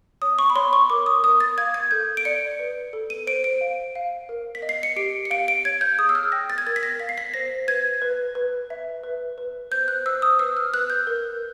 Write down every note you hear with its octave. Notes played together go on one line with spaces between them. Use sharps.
C#5 D#6
C#6
B5
C#5 C6
C#6
A#4 D6
D#6
A#4 D#6
A6
F5 G#6
G#6
A4 G6
D7
D5 C#7
B4
A4
D#7
C5 D7
D7
F5
F5
A#4
B6
D#5
C7
C#7
G4 D7
C#7
F5 D7
D7
C#5 G#6
G6
G#4 D#6
E6
F6
G5 A#6
A6
G#6
A#4 A6
B6
A#6
F5 B6
C7
B6
C5 A#6
B4 G#6
B4
B4
E5
B4
B4
C5 G6
F#6
C5 E6
D#6
B4 E6
F6
B4 F#6
G6
A#4